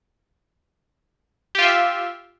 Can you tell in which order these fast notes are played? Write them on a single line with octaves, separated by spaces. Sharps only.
G4 F4 E5